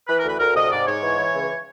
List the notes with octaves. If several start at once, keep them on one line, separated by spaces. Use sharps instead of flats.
E3 B4
D2 A#4
B4
D2 A#4
C3 D#5
G#2 D5
G#2 C#5
E3
E3
C#2